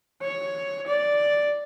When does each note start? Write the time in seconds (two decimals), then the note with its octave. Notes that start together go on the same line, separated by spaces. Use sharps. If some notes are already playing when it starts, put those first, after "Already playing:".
0.22 C#5
0.87 D5